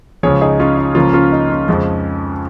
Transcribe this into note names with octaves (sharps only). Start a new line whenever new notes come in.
C#2 C#3 F3 G#4 C#5
D#4 G#4
C#4 F4
D#4
C#2 C#3 F3 A#3 C#4 F4
C#4 F4
D#4
C#4
F2 C#3 F3 G#3